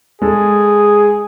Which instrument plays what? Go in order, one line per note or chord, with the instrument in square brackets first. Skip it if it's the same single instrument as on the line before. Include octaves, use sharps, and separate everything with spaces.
[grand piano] G#3 A4 [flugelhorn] G#4